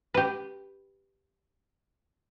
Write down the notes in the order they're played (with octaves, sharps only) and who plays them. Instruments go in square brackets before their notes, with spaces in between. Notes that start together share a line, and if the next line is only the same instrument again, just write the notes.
[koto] G4 B4